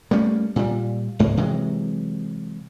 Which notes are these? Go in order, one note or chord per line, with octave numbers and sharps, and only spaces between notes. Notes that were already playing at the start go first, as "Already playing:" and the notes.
G3 A3 A#3 C#4
A#2 G3
C#2 G#2 A#3
C3 E3 F#3 G#3